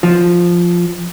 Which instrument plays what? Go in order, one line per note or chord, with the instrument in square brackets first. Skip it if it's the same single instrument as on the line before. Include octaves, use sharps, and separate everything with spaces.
[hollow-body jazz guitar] F3